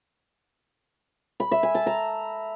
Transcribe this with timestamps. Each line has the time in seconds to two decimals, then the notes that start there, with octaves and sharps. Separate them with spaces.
1.40 B5
1.51 E5
1.63 G#5
1.75 A5
1.86 A#5